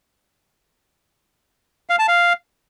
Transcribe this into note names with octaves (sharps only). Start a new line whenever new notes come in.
F5
A5
F5